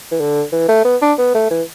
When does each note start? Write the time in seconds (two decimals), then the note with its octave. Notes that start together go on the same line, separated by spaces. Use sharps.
0.11 E3
0.20 D3
0.52 E3
0.68 A3
0.85 B3
1.02 D4
1.18 B3
1.34 A3
1.51 E3